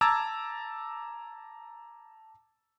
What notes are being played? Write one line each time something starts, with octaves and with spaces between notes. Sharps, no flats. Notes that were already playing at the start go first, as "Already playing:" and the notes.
A5 A#5 D6 E6 G#6 A6